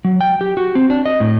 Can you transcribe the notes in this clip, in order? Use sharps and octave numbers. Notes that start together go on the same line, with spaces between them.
F#3
G5
G4
F#4
C4
D4
D#5
A2